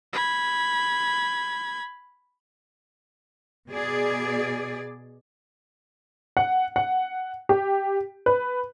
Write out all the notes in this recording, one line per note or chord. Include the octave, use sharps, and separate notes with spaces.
B5 G#6
B2 G#4 D5
F#5
F#5
G4
B4